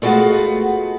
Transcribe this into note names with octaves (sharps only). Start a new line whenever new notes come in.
G#3 A3 B3 F4 F#4 D#5